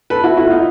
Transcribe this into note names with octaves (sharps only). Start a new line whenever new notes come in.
A4 B4
E4 F#4
E4 F#4
D#4 F4